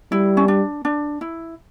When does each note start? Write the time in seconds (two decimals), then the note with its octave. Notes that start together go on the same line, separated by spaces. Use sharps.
0.12 G3 E4
0.37 C#4
0.48 D4
0.85 D4
1.21 E4